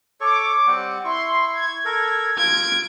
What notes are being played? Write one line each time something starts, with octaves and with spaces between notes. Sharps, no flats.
A4 C#5 C#6 D6
G3 C4 F#5
E4 C6 C#6
G#6
A4 A#4
F4 G#6 D7